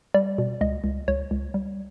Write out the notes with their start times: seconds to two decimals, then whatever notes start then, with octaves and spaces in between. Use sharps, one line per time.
0.14 G3 D5
0.38 B2
0.61 C#2 D#5
0.84 C#2
1.08 C#2 C#5
1.31 C#2
1.54 G3